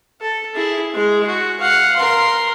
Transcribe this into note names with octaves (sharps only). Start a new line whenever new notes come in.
A4
E4 G#4
G#3 G#4
F#4
F5 F#5
A#4 C6